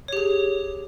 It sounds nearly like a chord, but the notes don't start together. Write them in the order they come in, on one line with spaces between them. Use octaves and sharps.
C#5 G4 G#4